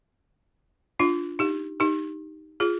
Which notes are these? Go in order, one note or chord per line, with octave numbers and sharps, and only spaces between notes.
D4 F4
D#4 G4
D#4 G4
F4 G#4